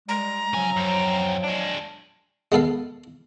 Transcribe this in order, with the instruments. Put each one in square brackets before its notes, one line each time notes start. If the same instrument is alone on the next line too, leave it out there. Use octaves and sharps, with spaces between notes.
[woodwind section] G3 G#3 [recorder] A#5
[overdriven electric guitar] C#3 G#5 [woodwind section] F3 F#3
[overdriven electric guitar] F#2 C4
G#3 D4
[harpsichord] G#3 B3 A4 F5